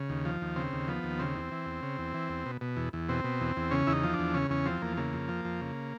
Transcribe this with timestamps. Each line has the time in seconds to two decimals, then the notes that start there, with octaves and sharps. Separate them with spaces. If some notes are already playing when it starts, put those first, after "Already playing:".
Already playing: C#3
0.10 D#2
0.25 F3
0.41 D#2
0.56 C#3 C4
0.73 D#2
0.88 F3 B3
1.03 D#2
1.19 C#3 C4
1.35 E2
1.51 E3
1.66 E2
1.83 C#3
1.98 E2
2.14 E3
2.29 E2
2.46 B2
2.61 B2
2.76 E2
2.93 E2
3.09 B2 C4
3.24 B2
3.41 E2
3.56 E2
3.71 C#3 C#4
3.87 E2 E4
3.93 D#4
4.04 F3
4.13 D4
4.19 E2
4.34 C#3 C#4
4.50 E2 C#4
4.65 F3 C4
4.82 E2 A#3
4.97 C#3 A#3
5.13 F2
5.28 F3
5.45 F2
5.61 C#3